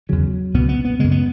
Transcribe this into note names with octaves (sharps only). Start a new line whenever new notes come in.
E2 C#3 F#3
C#2 B2 B3
B3
B3
F#2 C#3 G#3
B3